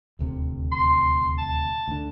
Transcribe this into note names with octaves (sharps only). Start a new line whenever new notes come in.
D#1 D2 C3
C6
A5
D2 D3